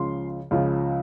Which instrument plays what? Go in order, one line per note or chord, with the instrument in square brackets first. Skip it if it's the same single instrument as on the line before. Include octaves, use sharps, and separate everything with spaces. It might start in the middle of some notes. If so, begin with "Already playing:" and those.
Already playing: [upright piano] C#2 C#3 F3 C6
C#2 C#3 F3